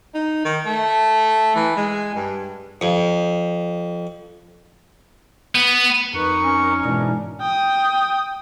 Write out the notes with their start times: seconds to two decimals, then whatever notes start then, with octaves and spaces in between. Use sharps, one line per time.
0.14 D#4
0.45 D#3
0.66 A3
1.56 E3
1.77 G#3
2.15 G2
2.81 F2
5.55 B3
6.14 F2 D#4 A#4 B4 C#6
6.43 C#4
6.85 G#2 B2 E3 D4
7.41 G5 D#6